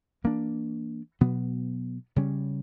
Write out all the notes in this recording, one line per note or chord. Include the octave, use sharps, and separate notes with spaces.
E3 A#3 D4
B2 F#3 B3
C#3 G3 C#4